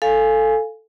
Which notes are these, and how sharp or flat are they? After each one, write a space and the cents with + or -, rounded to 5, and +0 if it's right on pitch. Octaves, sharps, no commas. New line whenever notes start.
A4 +0 F5 +0 G#5 +0